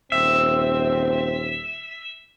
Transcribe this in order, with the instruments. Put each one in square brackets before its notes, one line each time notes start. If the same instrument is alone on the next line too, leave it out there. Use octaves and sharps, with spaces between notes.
[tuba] D#1 [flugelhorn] C4 [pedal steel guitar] E5